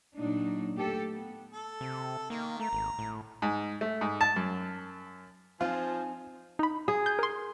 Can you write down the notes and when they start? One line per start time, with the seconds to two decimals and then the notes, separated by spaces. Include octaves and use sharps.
0.15 A#2 F#3 D4 D#4
0.76 A3 G4 A4
1.11 B3
1.53 A4
1.81 C3
2.30 D#3 A#3
2.60 A3 A#5
2.73 G#1
2.98 A2
3.42 G#2
3.81 A3
4.01 G#2
4.21 A5
4.36 F#2
5.61 F3 C4 D#4 F4 G#5
6.59 D#4 B5
6.88 G#4
7.06 G6
7.19 A#4 C6